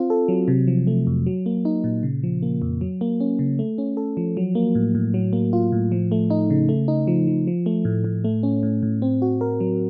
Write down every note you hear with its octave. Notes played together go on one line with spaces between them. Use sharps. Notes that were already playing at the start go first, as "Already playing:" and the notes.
Already playing: C4 F4
A4
F#3
C3
F3
A3
F2
F#3
A#3
D#4
A#2
C#3
F3
A#3
F2
F#3
A#3
C#4
C#3
A3
C#4
A4
F3
F#3
A#3
A2
A2
F#3
A#3
F4
A2
F3
A3
D#4
C#3
A3
D#4
F3
F3
F3
A3
A2
A2
A3
C#4
A2
A2
C4
F#4
A#4
F#3